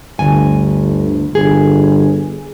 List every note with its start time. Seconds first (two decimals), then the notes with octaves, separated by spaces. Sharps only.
0.19 G1 D2 G#5
1.35 G1 G#4